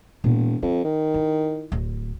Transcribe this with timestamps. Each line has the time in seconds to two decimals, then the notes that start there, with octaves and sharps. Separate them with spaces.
0.24 E1 A#2
0.62 F2 D#4
0.84 D#3
1.14 E4
1.72 D1